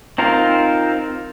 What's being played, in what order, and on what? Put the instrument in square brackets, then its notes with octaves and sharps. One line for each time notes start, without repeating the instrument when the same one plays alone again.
[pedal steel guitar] C4 D#4 F4 A#4